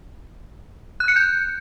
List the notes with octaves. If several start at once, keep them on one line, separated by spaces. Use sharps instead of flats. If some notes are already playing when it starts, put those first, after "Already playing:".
F#6
C#7
G6